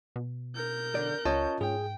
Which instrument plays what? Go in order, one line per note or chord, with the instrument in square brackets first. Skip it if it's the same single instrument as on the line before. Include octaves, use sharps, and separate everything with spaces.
[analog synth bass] B2
[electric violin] A#4 G6
[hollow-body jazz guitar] B1 D3 D5
[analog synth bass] C#2 [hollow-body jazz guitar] C#4 F4 [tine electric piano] C#5 D#5 A5
[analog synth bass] G#2 [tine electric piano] G#4 [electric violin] G5